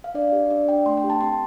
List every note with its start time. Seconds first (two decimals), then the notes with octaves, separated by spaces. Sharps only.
0.04 F5
0.15 D4 D5
0.32 G4
0.51 D4 D5
0.68 D4 G5
0.86 A3 C6
0.97 G5
1.04 G4
1.10 A5
1.21 C4 C6